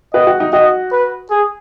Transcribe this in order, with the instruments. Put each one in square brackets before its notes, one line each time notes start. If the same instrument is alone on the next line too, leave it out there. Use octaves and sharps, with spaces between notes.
[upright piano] F#4 B4 [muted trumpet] D#5
[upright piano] F#4
D#4
[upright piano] F#4 [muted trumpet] D#5
[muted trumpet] B4
G#4